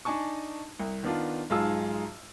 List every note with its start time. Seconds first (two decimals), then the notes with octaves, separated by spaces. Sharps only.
0.05 D4 D#4 G#5 A5 C#6
0.79 C2
1.03 D#3 B3 D4 F4
1.50 B1 G#2 F4 G#4 A5 E6